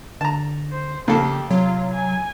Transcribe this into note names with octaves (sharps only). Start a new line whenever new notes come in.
D3 A5 A#5
C5
F2 C#3 A#3 G4 A4
C3 F#3 F4
G#5